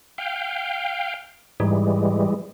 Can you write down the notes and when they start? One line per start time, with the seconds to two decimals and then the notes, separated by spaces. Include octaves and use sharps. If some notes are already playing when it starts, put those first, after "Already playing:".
0.18 F5 G5
1.60 G#2 E3 G3 G#3